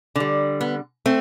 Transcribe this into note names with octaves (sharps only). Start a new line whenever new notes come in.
D3 G3
B3
A3 C4